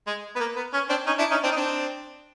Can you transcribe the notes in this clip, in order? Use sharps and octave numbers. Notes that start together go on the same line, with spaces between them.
G#3
B3
A#3
B3
C#4
C4 D4
C#4 D#4
D4 E4
C#4 D#4
C4 D4
D#4
C4 D4